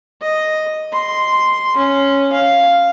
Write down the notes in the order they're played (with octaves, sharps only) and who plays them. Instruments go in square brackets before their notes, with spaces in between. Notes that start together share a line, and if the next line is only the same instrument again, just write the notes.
[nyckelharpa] D#5
C6
C#4
F5